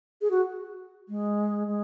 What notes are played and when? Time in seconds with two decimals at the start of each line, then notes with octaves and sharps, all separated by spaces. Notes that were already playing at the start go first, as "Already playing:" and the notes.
0.21 G#4
0.31 F#4
1.09 G#3
1.67 G#3